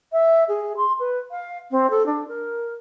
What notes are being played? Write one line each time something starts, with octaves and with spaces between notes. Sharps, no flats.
E5
G#4
C6
B4
F5
C4
A4
D4
A#4